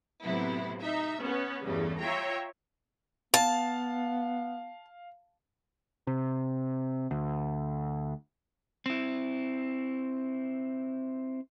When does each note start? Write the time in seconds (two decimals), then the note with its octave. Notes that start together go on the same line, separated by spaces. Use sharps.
0.22 A2 C3 F#3 B3 E4
0.81 D#4 E5
1.19 B3 C#4
1.64 E2 G2 C#3 G3 A3
2.00 F4 C#5 E5 G5 A#5
3.34 B3 F5 A5
6.07 C3
7.11 D2
8.86 C4 E4